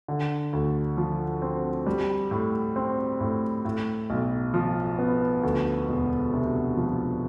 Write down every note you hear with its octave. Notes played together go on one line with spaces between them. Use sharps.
D3
D2
F3
C4
G3
A2
C4
A2
A2
B1
F3
B3
D2
E1
C3
F3